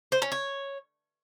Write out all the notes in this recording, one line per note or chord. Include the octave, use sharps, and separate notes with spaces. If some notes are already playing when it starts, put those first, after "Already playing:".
C5
C#4
C#5